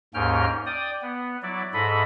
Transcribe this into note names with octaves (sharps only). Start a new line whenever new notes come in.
D#2 G#2 A#3 C#4 G5 F6
D5 G5 D#6
B3
F#3 E4 D5
G#2 A4 D#5 E5 B5